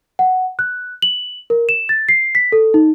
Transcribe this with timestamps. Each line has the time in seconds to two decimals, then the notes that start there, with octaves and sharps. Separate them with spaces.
0.19 F#5
0.59 F#6
1.02 F#7
1.50 A#4
1.69 E7
1.89 A6
2.09 C7
2.35 B6
2.52 A4
2.74 D#4